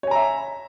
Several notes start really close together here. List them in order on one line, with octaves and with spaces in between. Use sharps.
C#5 G#5 A#5 E5